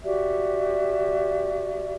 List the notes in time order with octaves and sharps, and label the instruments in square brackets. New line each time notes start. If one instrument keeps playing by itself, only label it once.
[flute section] F#4 G4 D5 E5